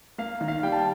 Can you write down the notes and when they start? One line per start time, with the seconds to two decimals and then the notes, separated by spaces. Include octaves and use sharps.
0.18 A#3 F5
0.41 D#3
0.48 F5
0.63 G3 G5
0.72 A5